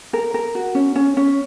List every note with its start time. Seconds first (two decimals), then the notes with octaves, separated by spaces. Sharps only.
0.13 A#4
0.34 A#4
0.55 F#4
0.75 C#4
0.96 C#4
1.17 C#4